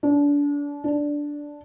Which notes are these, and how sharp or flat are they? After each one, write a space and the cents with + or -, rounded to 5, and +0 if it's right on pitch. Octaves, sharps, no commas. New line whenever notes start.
D4 -30
D4 -5